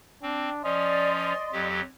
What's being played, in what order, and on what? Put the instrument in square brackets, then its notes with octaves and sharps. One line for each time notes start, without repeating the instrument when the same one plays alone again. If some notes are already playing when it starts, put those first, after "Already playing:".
[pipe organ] C4 [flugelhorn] D4
[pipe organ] F3 C#4 [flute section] D5 C6 [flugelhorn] D#5
[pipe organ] F2 F#3 G4